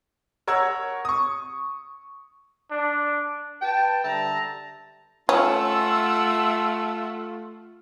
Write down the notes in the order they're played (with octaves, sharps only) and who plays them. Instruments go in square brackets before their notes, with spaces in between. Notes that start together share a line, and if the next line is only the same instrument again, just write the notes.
[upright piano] A#4 C#5 F#5 E6 G#6
C#6 D#6
[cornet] D4
[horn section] B4 G5 A5
D3 G3 E5 A5 A#5
[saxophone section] A3 F4 [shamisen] C#4 [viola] E5 F#5